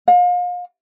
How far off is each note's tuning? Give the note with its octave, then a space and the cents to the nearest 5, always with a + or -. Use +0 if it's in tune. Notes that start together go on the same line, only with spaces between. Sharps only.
F5 +35